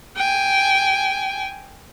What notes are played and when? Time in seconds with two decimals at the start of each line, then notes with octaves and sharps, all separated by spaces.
0.16 G5 G#5